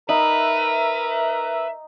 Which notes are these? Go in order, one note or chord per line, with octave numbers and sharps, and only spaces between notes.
D#4 A#4 B4 E5